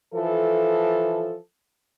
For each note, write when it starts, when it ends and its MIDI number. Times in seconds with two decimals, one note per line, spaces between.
0.13 1.35 52
0.13 1.35 53
0.13 1.35 69